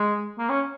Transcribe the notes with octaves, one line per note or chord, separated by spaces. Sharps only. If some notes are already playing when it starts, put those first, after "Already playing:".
Already playing: G#3
A#3
C#4